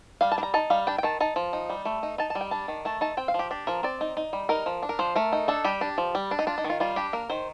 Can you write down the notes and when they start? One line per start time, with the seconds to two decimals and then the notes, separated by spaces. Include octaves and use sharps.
0.21 G3 F5
0.32 A5
0.38 D4
0.43 A#5
0.54 D#4 A5
0.70 G3 F5
0.87 D4 G5
0.98 G5
1.03 D#3 A5
1.20 D#4 A5
1.36 F3
1.53 D#4
1.70 G3
1.85 A3
2.03 D#4
2.18 D#4 A5
2.30 A5
2.35 G3
2.41 G5
2.51 D4 A5
2.68 D#3
2.85 A3 A5
3.01 D#4 A5
3.17 C4 G5
3.28 F5
3.34 F3 G4
3.51 D4 G4
3.67 F3 A#4
3.83 C4 D5
4.01 D#4
4.17 D#4
4.33 G3
4.49 D#4 A#4
4.66 F3
4.83 D4
4.89 A#4
4.99 F3 C5
5.16 A3 A#4
5.33 D#4
5.48 D4 A4
5.64 G3 G4
5.81 D4
5.98 F3
6.15 G3
6.31 D4
6.39 D#4
6.47 D4 F4
6.58 D#4
6.64 D#3
6.70 F4
6.80 G3 F4
6.96 D4 G4
7.13 A#3 A#4
7.30 D#3 C5